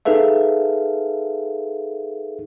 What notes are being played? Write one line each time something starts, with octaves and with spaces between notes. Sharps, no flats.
D#4 G#4 A4 B4 E5 F5